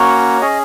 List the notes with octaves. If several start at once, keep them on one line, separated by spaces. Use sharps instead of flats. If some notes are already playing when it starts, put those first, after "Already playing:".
Already playing: A#3 C#4 F#4 C#5
C#4 G#4 D#5